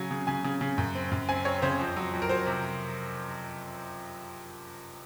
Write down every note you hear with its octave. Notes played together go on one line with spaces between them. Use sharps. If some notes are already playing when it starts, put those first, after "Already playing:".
Already playing: C#3 F#3 G#5
C#3
C#3 G#5
C#3
C#3
F#2
C4
F#2
C4 G#5
C4 C#5
C#3 C5
F2
F#3
F2
A#4
F#3 C5
C3